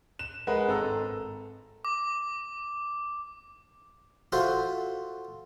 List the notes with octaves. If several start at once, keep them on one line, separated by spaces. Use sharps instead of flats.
E7
G#3 A#4 B4 D#5 F#5
G#1 A4 A#5 E6
D6
F4 F#4 A4 C5 E5